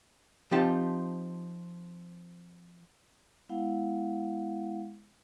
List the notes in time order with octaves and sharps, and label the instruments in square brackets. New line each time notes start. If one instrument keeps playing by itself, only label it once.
[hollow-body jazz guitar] F3 C4 D#4 F4 G4 A5
[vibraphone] G#3 B3 E4 F5 F#5